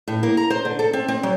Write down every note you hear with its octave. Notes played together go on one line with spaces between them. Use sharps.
A2
A#3
A#5
C5
D3
A4
C4
C4
F#3